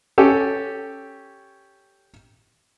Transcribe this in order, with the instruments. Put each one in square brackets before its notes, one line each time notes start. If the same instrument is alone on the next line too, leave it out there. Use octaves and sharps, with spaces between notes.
[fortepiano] C#4 G4 A4